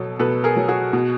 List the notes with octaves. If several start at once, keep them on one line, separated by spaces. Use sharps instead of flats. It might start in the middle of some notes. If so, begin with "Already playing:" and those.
Already playing: B2 F#3 A4
B2 A4 B4
G#4 A#4
F#3
F#4 G#4
B2